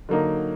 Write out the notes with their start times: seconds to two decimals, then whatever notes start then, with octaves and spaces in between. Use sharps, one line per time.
0.09 D3 F#3 A#3 D#4